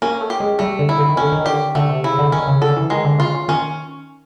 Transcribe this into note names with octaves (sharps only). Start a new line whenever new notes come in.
A#3 C#4
A3
G4
G#3
G3 A3
D3
E4
D3
D#3
D3 C#4
D#3
D3 G4
D3 A3
C3
C#3 E4
D3
D#3 C#4
C#3
D3 A4
E3
D#3 G#3
D3
C#3 F4
C#3
D#3 C#4